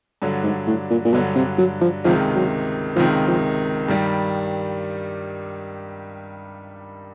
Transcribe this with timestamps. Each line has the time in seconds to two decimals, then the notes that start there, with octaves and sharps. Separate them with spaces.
0.22 G2 D3 F#3
0.43 G#2
0.67 A2
0.90 A#2
1.05 A#2
1.13 G2 B2 D3 F#3
1.36 C3
1.58 F#3
1.81 F3
2.04 C#2 C3 D#3 F3 G#3
2.35 F#3
2.96 C#2 C3 D#3 F3 G#3
3.28 F3
3.88 G2 D#3 G3